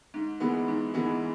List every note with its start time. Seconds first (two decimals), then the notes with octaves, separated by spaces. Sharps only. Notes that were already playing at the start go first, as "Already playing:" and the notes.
0.14 G#2
0.40 E3 G#3 B3
0.68 G#2
0.94 E3 G#3 B3